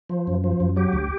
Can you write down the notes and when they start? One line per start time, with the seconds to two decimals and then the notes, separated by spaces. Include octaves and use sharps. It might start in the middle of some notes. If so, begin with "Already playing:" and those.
0.10 F3
0.27 F#2
0.44 F3
0.60 F#2
0.76 F#3 G4
0.93 D2